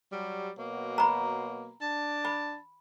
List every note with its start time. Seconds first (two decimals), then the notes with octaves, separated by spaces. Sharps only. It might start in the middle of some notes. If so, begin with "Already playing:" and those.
0.13 F#3 G3
0.57 B2 F#3 A#3
0.98 A#5 B5
1.82 D4 A5
2.25 B5